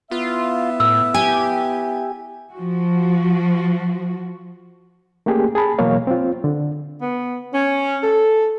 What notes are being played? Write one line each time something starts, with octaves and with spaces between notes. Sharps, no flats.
B3 E4 F4 E5
A2 E6
G4 G#5
F3 F#4
A3 A#3 C#4 G4 G#4
G#4 A5 B5
B2 E3 F#3 A#3 C#5 F5
C4 F4
D3
B3
C#4
A4